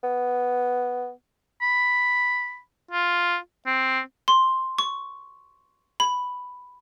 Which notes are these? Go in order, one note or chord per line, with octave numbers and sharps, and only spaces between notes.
B3
B5
F4
C4
C6
C#6
B5